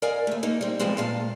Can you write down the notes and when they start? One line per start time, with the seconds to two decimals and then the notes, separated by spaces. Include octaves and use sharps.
0.02 A#4 D5 D#5 F5 G#5
0.27 D#2 A3
0.43 A#3 D#4
0.61 G3 C4
0.79 C3 F3 G3 G#3 B3 C4
0.97 A#2 F5 A5